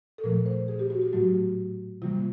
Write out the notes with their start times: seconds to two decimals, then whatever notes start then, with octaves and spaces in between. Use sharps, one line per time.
0.18 A4
0.24 A#2 F3 A3 A#4
0.46 C5
0.68 G#4
0.79 G4
0.90 F#4
1.02 G4
1.13 A2 F#3 A3 F#4
2.02 C3 E3 G3 A#3 F4